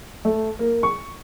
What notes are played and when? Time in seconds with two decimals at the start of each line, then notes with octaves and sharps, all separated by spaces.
0.25 A3
0.59 A#3
0.83 C#6